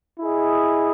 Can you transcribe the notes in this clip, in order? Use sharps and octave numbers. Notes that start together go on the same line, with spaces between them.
E4 G#4 D#5